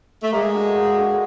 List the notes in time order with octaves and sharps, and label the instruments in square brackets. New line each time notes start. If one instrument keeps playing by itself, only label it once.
[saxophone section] A3
[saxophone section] G#3 [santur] A#3
[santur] D4 F#4 A4
A#3
D4 F#4 A4